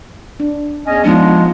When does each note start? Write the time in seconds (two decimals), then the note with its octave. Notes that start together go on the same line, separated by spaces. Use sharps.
0.40 D4
0.86 E2 C#4 D#5
1.05 F3 G#3 B3 D4 D#4 F4